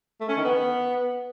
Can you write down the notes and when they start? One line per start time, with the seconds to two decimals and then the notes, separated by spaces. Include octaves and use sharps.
0.21 A3
0.29 C#4
0.37 D#3
0.45 B3